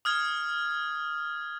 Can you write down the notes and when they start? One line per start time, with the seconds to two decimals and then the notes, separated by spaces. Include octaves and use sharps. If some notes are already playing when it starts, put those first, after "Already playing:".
0.05 D#6 F6 G#6